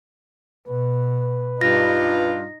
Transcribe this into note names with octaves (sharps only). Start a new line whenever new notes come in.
B2 B4
G2 D#4 F4 A#6